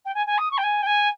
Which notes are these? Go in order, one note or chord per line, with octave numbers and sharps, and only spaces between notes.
G5
G#5
G#5
D#6
C#6
G5
G#5
G5
G#5